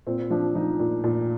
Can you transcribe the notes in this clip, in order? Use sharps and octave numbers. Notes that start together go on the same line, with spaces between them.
A#2 C4
F3 D4
F3 D#4
A#2
A#2